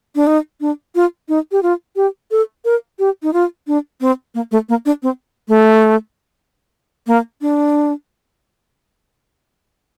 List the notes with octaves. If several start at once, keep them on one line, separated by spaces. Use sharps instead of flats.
D4
D#4
D4
F4
D#4
G4
F4
G4
A4
A#4
G4
D#4
F4
D4
C4
A#3
A3
A#3
D4
C4
A3
A#3
D4